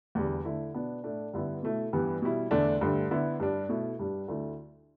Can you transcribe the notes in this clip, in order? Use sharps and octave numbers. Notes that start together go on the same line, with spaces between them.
E2 D3 G3
D3 A3 E4
B2 B3 D4
A2 A3 D4
G2 D3 B3 E4
B2 A3 E4
G2 E3 G3 B3
B2 G3 E4
E2 D3 A3 D4
G2 D3 A3
D3 B3 E4
G2 G3 D4
B2 A3 E4
G2 G3 D4
D2 D3 A3 E4